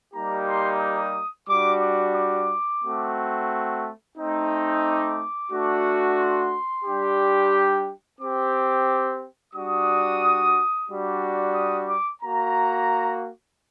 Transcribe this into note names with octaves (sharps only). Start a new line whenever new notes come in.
G3 A#3 D#4 G4 A#5
C6
D#6
G3 D4 F#4 D6
D6
D6
A3 C4 F#4
A3 C4 D#4
D6
A3 D4 F#4
C6
G3 D4 G4
C4 D6
G4
G3 D4 F#4 D#6
G3 D4 F#4
D#6
D6
A#3 F#4 A#5